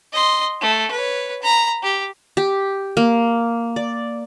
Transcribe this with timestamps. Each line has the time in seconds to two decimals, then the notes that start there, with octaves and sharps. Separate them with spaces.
0.13 D#5 C6
0.61 A3
0.91 B4 C#5
1.43 A#5 B5
1.83 G4
2.37 G4
2.97 A#3
3.76 D5